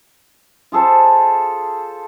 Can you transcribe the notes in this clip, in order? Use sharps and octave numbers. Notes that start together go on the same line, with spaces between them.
F4 G#4 A4 C5